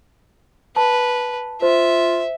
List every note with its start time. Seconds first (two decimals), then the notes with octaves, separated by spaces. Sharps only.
0.76 B4 A5
1.62 F4 C5 E5